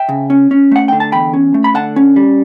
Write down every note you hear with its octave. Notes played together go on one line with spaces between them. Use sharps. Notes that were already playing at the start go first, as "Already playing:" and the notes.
Already playing: E5 G5
C#3
C#4
C#4
A3 F#5
D3 G5
A5
E2 G5 B5
C#4
A3
B5
D3 F#5 A5
C#4
G3